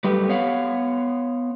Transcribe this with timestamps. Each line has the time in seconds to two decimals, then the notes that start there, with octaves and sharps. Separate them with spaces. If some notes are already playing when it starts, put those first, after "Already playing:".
0.04 F#2 G3 A3 G4 B4
0.28 B3 C#5 F5 F#5